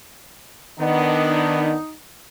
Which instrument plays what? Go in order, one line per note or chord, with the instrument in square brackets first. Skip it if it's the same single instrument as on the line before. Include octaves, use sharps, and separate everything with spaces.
[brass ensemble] D#3 B3 D4 [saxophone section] D#4